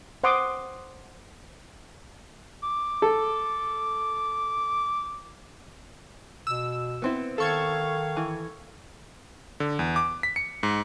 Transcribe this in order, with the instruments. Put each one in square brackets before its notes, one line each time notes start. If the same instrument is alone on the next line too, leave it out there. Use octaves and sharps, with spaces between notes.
[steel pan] C5 F#5 C6 D6 D#6
[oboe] D6
[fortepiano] A4
[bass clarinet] B2 [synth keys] E6
[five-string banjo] B3 C4 E4
[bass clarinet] D#3 [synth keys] A4 C#6 G#6 [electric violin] F5
[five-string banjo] E3
[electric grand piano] D3
E2
D6
B6
C#7
G#2